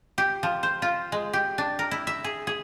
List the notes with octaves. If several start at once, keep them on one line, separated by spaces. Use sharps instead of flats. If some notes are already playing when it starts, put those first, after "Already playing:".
G4
F3
C5
F4
G#3
G4
D4
A#4
E4
E5
G#4
G#4